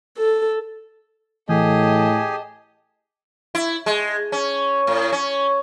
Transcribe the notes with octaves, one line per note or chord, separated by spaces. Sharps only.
A4
A2 E3 G4 G#4 D#5 G#5 A5
E4
G#3
C#4
A2
C#4